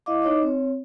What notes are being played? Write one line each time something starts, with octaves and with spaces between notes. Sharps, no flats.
E4 D#5 F5 D6
D#4 C#5 D#5 D6
C4 C#5